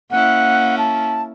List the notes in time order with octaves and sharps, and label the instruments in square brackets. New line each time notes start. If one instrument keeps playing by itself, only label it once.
[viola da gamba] A#3 C#4 E4 [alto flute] F#5
[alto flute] A5